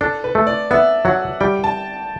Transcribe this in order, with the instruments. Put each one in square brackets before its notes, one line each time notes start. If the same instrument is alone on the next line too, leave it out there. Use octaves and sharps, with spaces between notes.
[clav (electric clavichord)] D4 [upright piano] A4
[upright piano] B4
[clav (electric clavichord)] A3
[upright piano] D5
[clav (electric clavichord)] B3 [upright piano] E5
[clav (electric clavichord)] F#3 [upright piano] F#5
[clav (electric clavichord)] G3 [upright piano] G5
[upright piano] A5